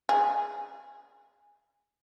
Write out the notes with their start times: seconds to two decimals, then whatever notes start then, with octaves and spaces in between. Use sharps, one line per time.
0.09 G#4